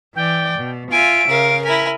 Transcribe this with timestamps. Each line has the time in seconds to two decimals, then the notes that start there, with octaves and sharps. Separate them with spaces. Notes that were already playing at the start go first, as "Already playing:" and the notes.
0.15 E3 D5 G5
0.59 B2
0.91 F4 E5 G#5 D7
1.29 C#3 A#4 F5
1.64 E4 A#4 G#5 B6